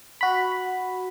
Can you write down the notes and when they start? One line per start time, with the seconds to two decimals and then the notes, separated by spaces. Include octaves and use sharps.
0.21 F#4 B5